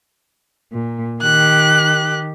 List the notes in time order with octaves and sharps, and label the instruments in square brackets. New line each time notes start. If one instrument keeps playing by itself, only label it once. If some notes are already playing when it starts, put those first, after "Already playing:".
[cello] A#2
[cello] D#3 G4 [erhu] F#6